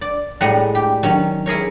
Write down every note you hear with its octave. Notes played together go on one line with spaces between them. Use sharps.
D5
A2 G3 G#3 F#5 A#5
G4
D#3 F#3 C#4
E4 G#4 A#4 C#5